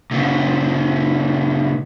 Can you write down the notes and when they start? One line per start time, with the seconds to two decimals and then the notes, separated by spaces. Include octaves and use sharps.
0.11 A#2 C#3